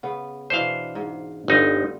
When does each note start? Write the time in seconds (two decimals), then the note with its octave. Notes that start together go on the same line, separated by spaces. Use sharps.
0.03 C#3 B3
0.50 B2 E3 D4 C5 F5
0.95 G#2
1.48 G1 D3 G3 D#4 F4